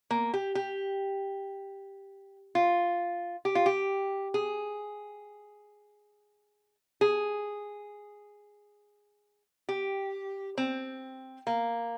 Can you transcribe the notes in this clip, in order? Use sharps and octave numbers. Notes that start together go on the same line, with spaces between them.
A#3
G4
G4
F4
G4
F4
G4
G#4
G#4
G4
C4
A#3